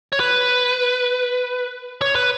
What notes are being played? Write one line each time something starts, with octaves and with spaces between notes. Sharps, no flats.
C#5
B4
C#5
B4